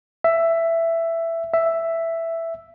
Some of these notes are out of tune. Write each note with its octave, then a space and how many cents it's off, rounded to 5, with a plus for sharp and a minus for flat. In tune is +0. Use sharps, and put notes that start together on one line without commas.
E5 +10
E5 +5